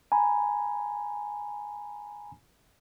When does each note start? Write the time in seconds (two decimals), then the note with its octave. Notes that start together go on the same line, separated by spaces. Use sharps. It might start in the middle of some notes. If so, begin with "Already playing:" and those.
0.12 G#5 A#5 B5